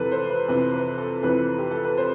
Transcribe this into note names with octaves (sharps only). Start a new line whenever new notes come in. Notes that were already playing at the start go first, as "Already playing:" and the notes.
Already playing: F2 C3 E3 A4 B4
C5
B4
F2 C3 E3 B4
B4
A4
F2 C3 E3 B4
G4
A4
B4
C5